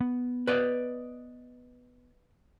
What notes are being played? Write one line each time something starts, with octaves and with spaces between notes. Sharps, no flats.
B3
B4 D5 D#5